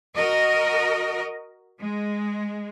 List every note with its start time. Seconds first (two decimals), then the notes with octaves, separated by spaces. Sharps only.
0.16 F#4 A#4 D#5
1.79 G#3